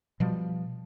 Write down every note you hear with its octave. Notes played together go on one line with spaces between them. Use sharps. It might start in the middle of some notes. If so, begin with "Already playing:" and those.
B2 F3 G3